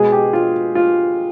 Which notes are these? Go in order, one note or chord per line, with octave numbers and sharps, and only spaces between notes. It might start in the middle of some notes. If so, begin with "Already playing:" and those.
Already playing: B2 G#3 G#4
G4
F4
F4